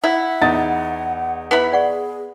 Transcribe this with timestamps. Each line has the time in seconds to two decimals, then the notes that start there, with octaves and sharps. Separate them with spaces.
0.04 E4 F#5
0.42 E2 D#4 A6
1.51 B3 E4 B5
1.72 G#4 D5 F#5 C#6